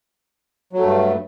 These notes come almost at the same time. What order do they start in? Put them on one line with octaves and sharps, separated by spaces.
F#3 A3 G2